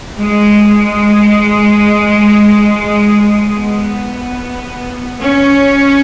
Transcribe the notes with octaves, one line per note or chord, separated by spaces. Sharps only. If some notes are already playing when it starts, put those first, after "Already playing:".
G#3
B3
C#4